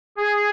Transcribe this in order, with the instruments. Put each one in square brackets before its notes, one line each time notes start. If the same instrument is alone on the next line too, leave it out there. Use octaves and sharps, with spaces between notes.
[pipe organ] G#4